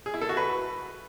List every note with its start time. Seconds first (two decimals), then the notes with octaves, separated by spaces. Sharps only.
0.06 G#4
0.14 E4
0.21 A4
0.29 F#4
0.37 B4